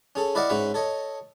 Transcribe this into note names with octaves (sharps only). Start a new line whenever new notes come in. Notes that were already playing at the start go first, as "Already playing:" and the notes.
C#4 G#4 A4
E4 B4 D5 D#5 F5 F#5
G#2 C#4 F#4 B4 E5
A4 C#5 D#5